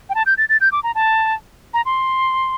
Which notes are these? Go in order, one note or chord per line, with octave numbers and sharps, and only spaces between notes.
G5
A5
G6
A6
A6
G6
D6
A#5
A5
A#5
C6